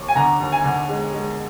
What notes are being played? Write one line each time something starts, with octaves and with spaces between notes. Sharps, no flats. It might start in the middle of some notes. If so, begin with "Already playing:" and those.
Already playing: D#2
G#5
D3 A#5
D#2
G#5
D3
G#3
G#3